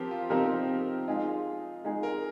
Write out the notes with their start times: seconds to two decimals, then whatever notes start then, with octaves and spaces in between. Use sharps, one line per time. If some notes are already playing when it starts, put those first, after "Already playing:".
Already playing: F3 C4 G4 A#4
0.11 F4
0.30 F3 C4 D#4 G4 A#4
1.08 G#3 D#4 F4 G#4
1.84 G#3 D#4 G#4
2.03 A#4